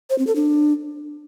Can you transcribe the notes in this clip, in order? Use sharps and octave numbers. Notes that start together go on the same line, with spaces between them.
C5
C4
A4
D4